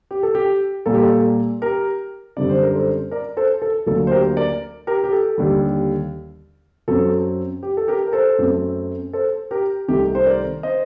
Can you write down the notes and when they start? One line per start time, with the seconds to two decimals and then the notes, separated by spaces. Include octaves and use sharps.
0.11 G4
0.23 A4
0.35 G4
0.86 A#2 G3 A#3 A4
0.94 G4
1.02 A4
1.61 G4 A#4
2.37 F#2 D3 G3 C4 D5
2.49 C5
2.63 A#4
2.75 A4 C5
3.11 A#4 D5
3.37 A4 C5
3.62 A4
3.86 D2 D3 F#3 A#3 A4
4.07 C5
4.12 G4 A#4
4.37 A#4 D5
4.87 G4 A#4
5.04 G4
5.12 A4
5.38 D#2 D3 G3
6.88 F#2 F#3 C4 A4
7.63 G4
7.77 A4
7.88 G4 A#4
8.07 A#4
8.13 A4 C5
8.38 F#2 F#3 A3 C4
9.13 A4 C5
9.51 G4 A#4
9.88 C2 C3 D#3 A3 G4
10.15 C5
10.26 A#4 D5
10.63 C5 D#5